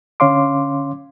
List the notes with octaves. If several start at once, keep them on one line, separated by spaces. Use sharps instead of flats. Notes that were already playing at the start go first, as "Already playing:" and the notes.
D3 C#4 C#5 F5 C6 D6